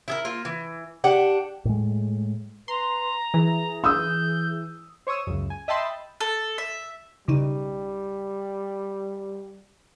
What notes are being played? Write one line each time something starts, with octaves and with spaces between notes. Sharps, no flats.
E4 G#4 A#4
A#3 F4
E3
D4 G4 F#5
A2 G#3
B4 A#5 C6
E3 G#4
D#6 E6 G6
C5 C#5 C#6 D#6 E6
C#2 F#2
G#5
D#5 E5 G5 A5 B5 C6
A4
E5
B1 C#3 G3 D#4